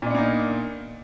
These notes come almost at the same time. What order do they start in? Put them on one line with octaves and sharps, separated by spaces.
A#2 D4 B3 A#3 D#4